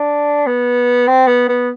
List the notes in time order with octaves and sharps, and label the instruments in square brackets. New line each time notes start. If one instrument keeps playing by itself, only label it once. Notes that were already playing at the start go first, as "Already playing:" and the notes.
Already playing: [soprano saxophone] D4
B3
C4
B3
B3